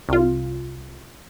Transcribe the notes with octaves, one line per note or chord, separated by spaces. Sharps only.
C2 F4